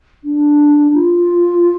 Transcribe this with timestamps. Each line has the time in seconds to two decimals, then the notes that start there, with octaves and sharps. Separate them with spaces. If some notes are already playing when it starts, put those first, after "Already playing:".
0.24 D4
0.94 F4